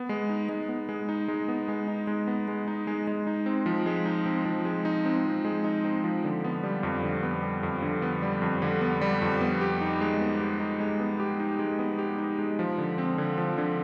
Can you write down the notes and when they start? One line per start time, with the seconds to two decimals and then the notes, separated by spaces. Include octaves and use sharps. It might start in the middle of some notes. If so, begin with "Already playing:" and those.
Already playing: B3
0.09 G#3
0.30 D#4
0.49 G#3
0.69 B3
0.89 G#3
1.09 D#4
1.28 G#3
1.48 B3
1.68 G#3
1.88 D#4
2.07 G#3
2.27 B3
2.48 G#3
2.68 D#4
2.87 G#3
3.07 G#3
3.27 D#4
3.46 C4
3.66 F3
3.86 G#3
4.06 D#4
4.26 C4
4.45 F3
4.65 G#3
4.85 D#4
5.05 C4
5.25 F3
5.45 G#3
5.64 D#4
5.84 C4
6.04 F3
6.24 D3
6.44 B3
6.63 G3
6.83 F2
7.03 D3
7.23 B3
7.43 G3
7.63 F2
7.82 D3
8.02 B3
8.23 G3
8.42 F2
8.62 D3
8.81 B3
9.01 G3
9.22 F2
9.41 B3
9.61 G4
9.81 D#4
10.01 G#3
10.20 B3
10.40 G4
10.60 D#4
10.80 G#3
11.00 B3
11.20 G4
11.40 D#4
11.59 G#3
11.79 B3
11.99 G4
12.18 D#4
12.39 G#3
12.59 F3
12.78 D3
12.98 C4
13.18 D3
13.38 F3
13.58 D3